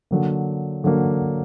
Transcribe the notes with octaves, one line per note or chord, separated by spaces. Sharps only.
D3 F#3 A#3
D3 F#3 A#3